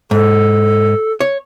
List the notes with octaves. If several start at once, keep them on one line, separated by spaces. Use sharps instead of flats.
G#2 A4
C#5